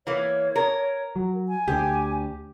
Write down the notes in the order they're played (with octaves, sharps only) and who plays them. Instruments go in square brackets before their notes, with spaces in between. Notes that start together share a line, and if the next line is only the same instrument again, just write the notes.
[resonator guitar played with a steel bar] E3 A#3 [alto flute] C#5
[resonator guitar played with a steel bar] A#4
[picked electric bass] F#3
[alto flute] G#5
[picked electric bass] D2 D3 [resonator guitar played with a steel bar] G4